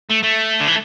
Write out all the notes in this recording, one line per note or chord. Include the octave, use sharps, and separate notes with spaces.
A3
A3
D3
E3